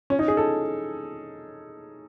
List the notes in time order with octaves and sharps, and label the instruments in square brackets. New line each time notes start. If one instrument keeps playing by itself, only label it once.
[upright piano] C#4
D#4
G#4
A4